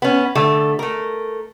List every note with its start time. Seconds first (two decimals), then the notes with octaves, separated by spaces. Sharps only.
0.02 B3 C#4
0.35 D3 A3
0.79 A3 A#4